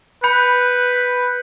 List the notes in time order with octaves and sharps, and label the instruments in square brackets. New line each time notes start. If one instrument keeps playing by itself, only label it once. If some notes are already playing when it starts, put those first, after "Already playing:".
[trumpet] B4 [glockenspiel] B5 G6 C#7